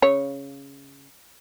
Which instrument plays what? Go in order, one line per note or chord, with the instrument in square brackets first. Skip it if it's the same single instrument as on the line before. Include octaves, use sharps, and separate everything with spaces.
[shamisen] C#3 C#5